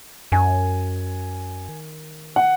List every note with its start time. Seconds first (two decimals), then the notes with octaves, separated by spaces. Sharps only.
0.32 F#2 G#5
1.69 D#3
2.36 F#5